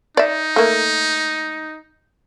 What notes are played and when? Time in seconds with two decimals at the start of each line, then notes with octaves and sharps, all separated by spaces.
0.17 D#4 D5 E5
0.56 A3 A#3